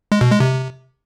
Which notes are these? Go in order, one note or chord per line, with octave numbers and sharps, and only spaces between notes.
G#3
B2
G#3
C3